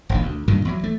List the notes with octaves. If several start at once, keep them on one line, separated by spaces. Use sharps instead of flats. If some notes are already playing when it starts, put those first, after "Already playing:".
E1 A#1 D#3
D2
G2 A#2 D#3
E2 F#3
A3